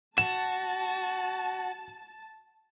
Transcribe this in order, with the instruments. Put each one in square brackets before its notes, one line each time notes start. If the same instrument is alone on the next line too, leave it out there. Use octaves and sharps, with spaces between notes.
[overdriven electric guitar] F#4 [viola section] A5 [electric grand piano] E7